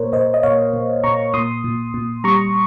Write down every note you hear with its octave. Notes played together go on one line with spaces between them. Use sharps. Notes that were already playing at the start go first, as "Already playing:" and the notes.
Already playing: A#2 A#3 A#4 C5 C#5
A#2 C5 D#5
D#5
A#2 C#5 F5
A#2
A#2 A#5 C#6
A#2 C6 D#6
A#2
A#2
G3 A#5 C#6